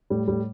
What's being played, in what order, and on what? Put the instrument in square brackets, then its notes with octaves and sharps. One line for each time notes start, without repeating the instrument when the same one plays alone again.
[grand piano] A2 G3
A2 G3